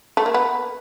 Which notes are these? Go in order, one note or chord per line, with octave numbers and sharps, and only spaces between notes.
A3
A#3
B3